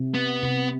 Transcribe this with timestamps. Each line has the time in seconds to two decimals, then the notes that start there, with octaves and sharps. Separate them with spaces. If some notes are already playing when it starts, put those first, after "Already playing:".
Already playing: C3
0.14 B3
0.43 C3